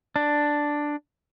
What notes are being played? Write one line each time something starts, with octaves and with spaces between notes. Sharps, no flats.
D4